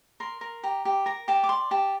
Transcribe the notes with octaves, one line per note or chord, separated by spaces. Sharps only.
A#4 C6
A#4
G4 A#5
G4
A#4 A#5
G4 A5
D6
D5 C6
G4 A5